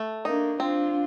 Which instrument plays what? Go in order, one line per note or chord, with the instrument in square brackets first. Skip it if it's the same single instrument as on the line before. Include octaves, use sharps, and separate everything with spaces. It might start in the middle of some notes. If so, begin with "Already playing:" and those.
Already playing: [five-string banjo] A3
[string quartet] A#3 D4 [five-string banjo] D#4
[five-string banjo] C4 [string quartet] D4 F4